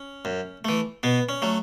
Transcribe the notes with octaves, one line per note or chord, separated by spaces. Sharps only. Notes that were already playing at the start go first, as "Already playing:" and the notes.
Already playing: C#4
F#2
E3 A3
B2 B3
C#4
F#3 A3